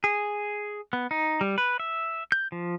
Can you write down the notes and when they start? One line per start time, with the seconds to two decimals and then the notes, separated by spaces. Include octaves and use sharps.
0.04 G#4
0.93 B3
1.11 D#4
1.41 G3
1.58 B4
1.80 E5
2.32 G6
2.52 F3